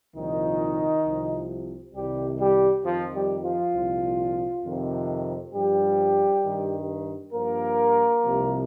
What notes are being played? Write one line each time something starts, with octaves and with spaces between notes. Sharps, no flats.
C2 A#2 D#3 F3 D#4
C2 C3 F3
C2 C3 D#3 G3 G4
G3 G4
F2 D#3 F3 F4
G3 G4
F3 F4
C2 A#2 F3
F2 C3 D#3
G2 F3 G3 G4
G2 D#3
G2 F3 A#3 A#4
C2 C3 F3